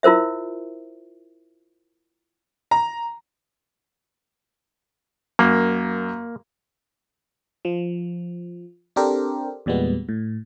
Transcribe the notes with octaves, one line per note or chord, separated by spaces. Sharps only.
E4 F4 A#4 C5 E5
A#5
F#2 A#3
F3
C4 D4 G4 A4 A#4 C5
E2 A#2 G3 G#3 B3
A2